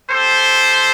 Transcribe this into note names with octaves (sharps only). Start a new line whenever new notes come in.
C4 G4 A4 C5